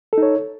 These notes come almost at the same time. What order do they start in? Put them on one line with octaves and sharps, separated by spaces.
A4 D#4 C#5